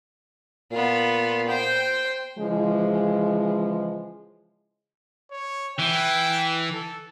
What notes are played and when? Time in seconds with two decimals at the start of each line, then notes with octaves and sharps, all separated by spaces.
0.72 A#2 B3 F4
1.49 C5 G5
2.39 C#3 E3 F3 G#3
5.31 C#5
5.79 E3 G5
6.73 A4